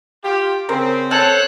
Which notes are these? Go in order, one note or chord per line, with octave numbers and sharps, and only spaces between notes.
F4 G4
C#3 C4 A#4
A4 C5 C#5 A5 F#6